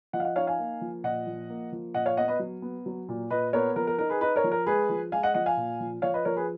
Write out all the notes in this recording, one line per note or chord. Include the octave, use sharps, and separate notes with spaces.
F3 D#5 F#5
F5
D#5 F#5
D#4 C#5 F5
F5 G#5
A#3
F3
A#2 D#5 F#5
F3
A#3
F3
A#2 D#5 F#5
C#5 F5
B3 D#5 F#5
B4 D#5
F#3
B3
F#3
A#2
A#2 B4 D#5
B3 A#4 C#5
F3 A#4
A#4
D#4 A#4
G#4 B4
D#4 B4 D#5
A#4 C#5
F3
A#4
G#3 G#4 B4
F3
G#3 F5 G#5
D#5 F#5
F3 D#5 F#5
F5 G#5
A#2
F3
F3 C#5 F5
B4 D#5
F3 A#4 C#5
G#4 B4